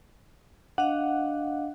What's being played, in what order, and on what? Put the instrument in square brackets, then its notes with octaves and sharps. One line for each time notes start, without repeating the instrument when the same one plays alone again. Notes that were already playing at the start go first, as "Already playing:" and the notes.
[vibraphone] D4 D#5 F5 [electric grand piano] F#5